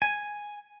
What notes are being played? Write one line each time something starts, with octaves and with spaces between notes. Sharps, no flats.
G#5